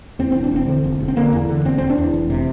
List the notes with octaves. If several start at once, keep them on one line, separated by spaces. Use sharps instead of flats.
E2 C4
C4
E1
D4
E1 C4
D3
E1
E1
C4
D3 A#3
E2
D3
E1 C4
E2 C4
D4
E2
F1
C3